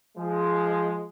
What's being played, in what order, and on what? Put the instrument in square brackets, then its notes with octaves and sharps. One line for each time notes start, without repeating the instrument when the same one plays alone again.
[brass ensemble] F3 G#3